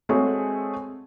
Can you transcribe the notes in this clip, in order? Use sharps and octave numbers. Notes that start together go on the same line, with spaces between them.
G#3 A3 C4 F#4 G#4 C#5